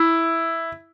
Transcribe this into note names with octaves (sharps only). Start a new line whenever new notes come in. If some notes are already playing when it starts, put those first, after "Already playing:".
Already playing: E4